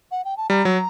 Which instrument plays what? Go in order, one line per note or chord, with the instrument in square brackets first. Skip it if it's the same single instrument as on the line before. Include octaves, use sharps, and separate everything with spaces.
[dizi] F#5
G5
A5
[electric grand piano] G3 [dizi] A#5
[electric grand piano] F#3